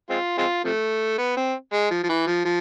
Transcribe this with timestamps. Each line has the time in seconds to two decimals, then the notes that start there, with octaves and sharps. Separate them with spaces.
0.10 G#3 C4 F4
0.38 G#3 C4 F4
0.64 C3 F3 A3
1.18 B3
1.37 C4
1.73 G#3
1.91 F3
2.03 F3
2.09 E3
2.27 F3
2.45 F3